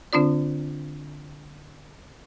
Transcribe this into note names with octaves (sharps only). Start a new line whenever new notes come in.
D3 C4 D4 F4 D5